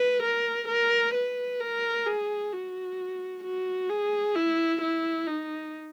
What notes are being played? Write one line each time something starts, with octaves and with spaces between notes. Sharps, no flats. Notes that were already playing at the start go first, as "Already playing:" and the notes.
Already playing: B4
A#4
A#4
B4
A#4
G#4
F#4
F#4
G#4
E4
E4
D#4